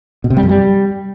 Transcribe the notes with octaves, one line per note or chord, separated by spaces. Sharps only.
B2
C3
G3
F#2
G3